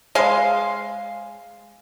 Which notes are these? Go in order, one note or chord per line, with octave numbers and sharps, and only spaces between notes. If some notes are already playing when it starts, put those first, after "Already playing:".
G#3 F5 C6